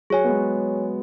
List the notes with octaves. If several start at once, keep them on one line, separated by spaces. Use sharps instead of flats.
F#3 G#4 C#5 G#5
B3
G#3